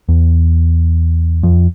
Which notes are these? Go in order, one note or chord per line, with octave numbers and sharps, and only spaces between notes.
E2
F2